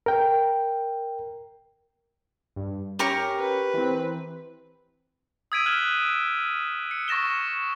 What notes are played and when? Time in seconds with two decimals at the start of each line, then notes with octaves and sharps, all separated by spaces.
0.06 A#4 G5
2.56 G2
2.99 C#4 G4 A#4 C#6
3.39 B4
3.74 E3 C4
5.52 D#6 E6 G#6 B6 D7 D#7
5.66 F6 F#6 E7 F#7
6.91 C#7
7.08 C#6 A6 A#6 E7 G7